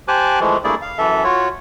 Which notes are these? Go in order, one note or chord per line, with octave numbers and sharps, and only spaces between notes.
G4 C5 G#5 A5 D6 F#6
E3 F3 G#3 A3
G2 A3 A#3 E4 G#4 D5
F5
F#2 E3 A4 E5
F4 F#4 C#5